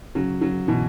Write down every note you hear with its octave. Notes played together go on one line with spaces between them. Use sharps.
C#3 F#3
C#3 F#3
B2 E3